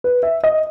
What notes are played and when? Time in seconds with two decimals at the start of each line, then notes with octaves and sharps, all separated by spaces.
0.04 B4
0.23 E5
0.44 D#5